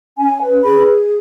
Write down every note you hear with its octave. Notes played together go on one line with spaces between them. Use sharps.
C#4 G#5
B4
G#4 B5